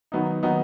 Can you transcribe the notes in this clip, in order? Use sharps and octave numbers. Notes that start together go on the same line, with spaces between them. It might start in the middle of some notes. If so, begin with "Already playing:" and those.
D#3 F#3 B3 D#4
D#3 F#3 B3 D#4